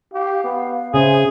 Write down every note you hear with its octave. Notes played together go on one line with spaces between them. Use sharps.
G4 F5
B3
C#3 G#4 C5 E5